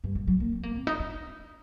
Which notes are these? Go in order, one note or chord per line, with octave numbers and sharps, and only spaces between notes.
G2
G2
F#3
A#3
C4
A#3
C4
D#4
D4